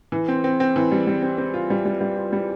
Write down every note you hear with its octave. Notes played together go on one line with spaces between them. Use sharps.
E3
C4
C4
C4
E3
G3
G3
C4
C4
F4
G3
G3
G3
F4
G3